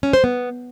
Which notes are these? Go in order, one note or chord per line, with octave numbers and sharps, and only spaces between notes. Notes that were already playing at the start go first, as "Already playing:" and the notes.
C#4
C5
B3